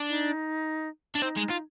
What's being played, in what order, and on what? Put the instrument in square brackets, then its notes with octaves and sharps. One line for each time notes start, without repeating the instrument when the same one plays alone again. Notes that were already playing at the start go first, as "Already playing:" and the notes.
Already playing: [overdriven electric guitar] D4
[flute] D#4
[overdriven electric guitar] D4
[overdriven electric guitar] C4 [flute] D#4
[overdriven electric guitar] G#3
F4